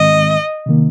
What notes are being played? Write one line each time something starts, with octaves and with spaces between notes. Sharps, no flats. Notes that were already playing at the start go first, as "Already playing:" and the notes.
Already playing: G#2 D#3 G#3 C4 D#5
C3 D#3 A#3